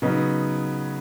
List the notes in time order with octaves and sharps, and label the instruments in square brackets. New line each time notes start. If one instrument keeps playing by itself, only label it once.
[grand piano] C#3 F#3 B3 D#4